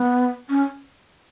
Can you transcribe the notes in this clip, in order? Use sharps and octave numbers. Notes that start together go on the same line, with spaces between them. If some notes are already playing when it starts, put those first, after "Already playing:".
Already playing: B3
C#4